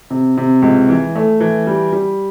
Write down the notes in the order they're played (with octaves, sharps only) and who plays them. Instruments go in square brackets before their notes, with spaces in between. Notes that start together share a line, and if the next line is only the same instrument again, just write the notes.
[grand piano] C3
C3
C#2
E3
A3
E3
G3
G3